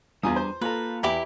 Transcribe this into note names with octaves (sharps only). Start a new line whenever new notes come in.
E2 G3 D4 F4 G#4 G#5 A#5 D#6
C5
A#3 F4 A4 B4 A5 A#5
E2 E4 G4 B5 D6